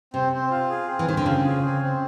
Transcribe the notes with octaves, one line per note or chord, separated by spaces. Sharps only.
C3 C4
C4
F4
G#4
C4
E3
D#3 C4
D3
C#3 F4
G#4
C4
C4